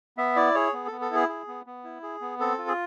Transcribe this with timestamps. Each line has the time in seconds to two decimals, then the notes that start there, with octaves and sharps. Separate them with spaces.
0.17 B3 E5
0.36 E4 D5
0.55 G#4 C#5
0.73 B3
0.87 B3 A4
1.01 A4
1.10 E4 G#4
1.29 G#4
1.48 B3
1.66 B3
1.84 E4
2.03 G#4
2.21 B3
2.40 C4 A4
2.58 F4
2.68 G#4